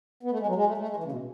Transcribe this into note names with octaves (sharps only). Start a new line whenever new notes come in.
B3
A3
G#3
F#3
G#3
A3
A3
G#3
E3
C#3
B2